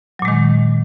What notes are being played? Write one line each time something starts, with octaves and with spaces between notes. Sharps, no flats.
A#2 D#3 F#3 G#3